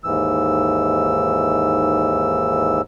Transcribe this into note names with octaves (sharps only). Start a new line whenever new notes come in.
D#2 G#2 E3 E6